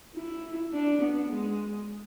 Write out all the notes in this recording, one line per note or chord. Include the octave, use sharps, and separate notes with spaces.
E4
D4
B3
G#3